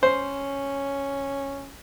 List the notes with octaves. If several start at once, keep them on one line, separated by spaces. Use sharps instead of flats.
C#4 C5